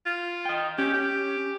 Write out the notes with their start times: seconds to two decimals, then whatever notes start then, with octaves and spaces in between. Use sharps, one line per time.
0.06 F4
0.45 D#5 G5
0.78 C#4 G4
0.94 G4